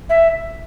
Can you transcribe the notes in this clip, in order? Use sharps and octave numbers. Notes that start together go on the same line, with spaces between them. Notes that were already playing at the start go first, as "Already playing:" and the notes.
E5